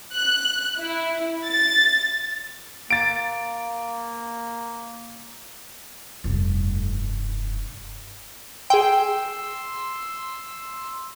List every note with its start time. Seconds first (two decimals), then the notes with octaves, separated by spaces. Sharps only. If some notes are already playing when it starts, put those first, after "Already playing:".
0.12 F#6
0.78 E4
1.45 A6
2.91 A#3 A6 D7
6.24 F1 G2
8.70 G#4 G5 C6 E6